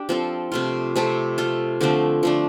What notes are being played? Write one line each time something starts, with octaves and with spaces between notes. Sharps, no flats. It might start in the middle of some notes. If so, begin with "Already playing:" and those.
Already playing: D4 G4
F3 C4 A4
C3 A3 F4
C3 A3 C4 A4
A3 F4 A4
D3 F3 A3 C4
F3 A3 D4